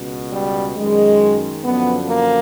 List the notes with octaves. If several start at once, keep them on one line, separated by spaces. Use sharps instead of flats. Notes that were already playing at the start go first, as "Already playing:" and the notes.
Already playing: C#2 B2
G3
F#2 D#3 G#3
F#2 D3 F3 B3
A#3